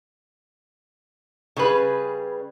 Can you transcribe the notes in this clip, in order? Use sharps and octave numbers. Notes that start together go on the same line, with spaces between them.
C#3 G3 G#4 B4